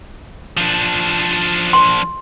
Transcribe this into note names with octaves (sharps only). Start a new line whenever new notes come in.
F3 D4
C6